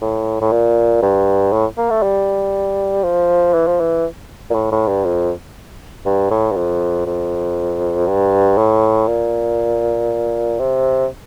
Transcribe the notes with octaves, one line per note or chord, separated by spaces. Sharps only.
A2
A2
A#2
G2
A2
A#3
A3
G3
F3
E3
F3
E3
A#2
A2
A2
G2
F2
G2
A2
G2
F2
F2
G2
A2
A#2
C3